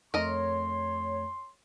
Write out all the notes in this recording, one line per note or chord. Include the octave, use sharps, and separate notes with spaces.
F2 A3 A#4 C#5 D#5 C6